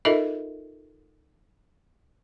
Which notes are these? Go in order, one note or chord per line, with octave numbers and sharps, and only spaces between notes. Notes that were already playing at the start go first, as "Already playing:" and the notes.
D#4 F4 A4 A#4 D#5 E5